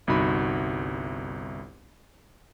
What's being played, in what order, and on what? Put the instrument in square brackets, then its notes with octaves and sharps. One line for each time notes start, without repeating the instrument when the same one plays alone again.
[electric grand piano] G1 C2 D#4 F#4 B5